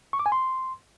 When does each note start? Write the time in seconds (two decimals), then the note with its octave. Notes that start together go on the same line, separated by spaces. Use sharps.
0.13 C#6
0.19 D6
0.26 G#5
0.32 C6